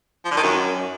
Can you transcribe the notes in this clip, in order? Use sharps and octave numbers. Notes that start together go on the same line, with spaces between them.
F3
D3
D#3
F#2